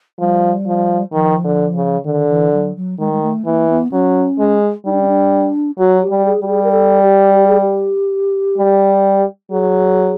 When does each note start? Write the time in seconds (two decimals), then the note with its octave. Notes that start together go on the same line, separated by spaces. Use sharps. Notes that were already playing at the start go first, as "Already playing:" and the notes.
0.19 F3 G3
0.66 F3
1.13 D#3 F3
1.44 D3
1.75 C#3
2.05 D3 D#3
2.29 E3
2.53 F#3
2.76 F#3
2.99 D#3 G#3
3.13 G#3
3.22 A3
3.45 E3 A#3
3.70 B3
3.92 F#3 C#4
4.39 G#3
4.86 G3 D#4
4.93 D4
5.01 C#4
5.08 D4
5.79 F#3 F#4
6.02 G4
6.10 G3
6.26 G#4
6.41 G3 G4
6.48 G#4
6.64 A#4
6.72 A4
7.03 G4
7.34 G4
7.48 G#4
7.61 G4
8.58 G3
9.51 F#3 G#4